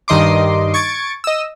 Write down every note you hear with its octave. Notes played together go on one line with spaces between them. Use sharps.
G2 D#3 D#5 C6 D6
C#6 G#6 A6 D7
D#5 E6